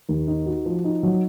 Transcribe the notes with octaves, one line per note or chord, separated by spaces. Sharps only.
D#2
D#4
F#4
F3
D#4
F#3